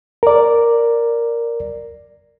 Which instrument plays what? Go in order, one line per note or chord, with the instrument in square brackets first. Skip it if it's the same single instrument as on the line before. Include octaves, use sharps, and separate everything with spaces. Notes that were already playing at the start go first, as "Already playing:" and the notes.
[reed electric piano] A#4 D5